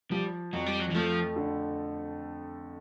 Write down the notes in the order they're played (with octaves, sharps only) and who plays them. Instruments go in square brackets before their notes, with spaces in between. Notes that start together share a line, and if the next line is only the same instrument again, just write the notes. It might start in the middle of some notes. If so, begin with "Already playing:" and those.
[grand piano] F3 [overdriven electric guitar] G3
[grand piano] F2 [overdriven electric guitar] F#3
[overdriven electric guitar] G3
F#3
E3
[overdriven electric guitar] F3 [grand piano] A3
[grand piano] D3